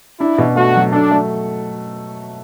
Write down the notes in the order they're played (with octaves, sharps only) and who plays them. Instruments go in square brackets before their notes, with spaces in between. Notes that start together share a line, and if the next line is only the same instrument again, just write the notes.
[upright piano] D4 [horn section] E4
[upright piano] B2
[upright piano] A3 [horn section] F#4
[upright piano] F#3
[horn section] D4 [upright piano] A4
[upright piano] A3